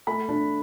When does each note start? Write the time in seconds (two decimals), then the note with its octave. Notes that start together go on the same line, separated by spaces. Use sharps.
0.07 A3 B5
0.28 D4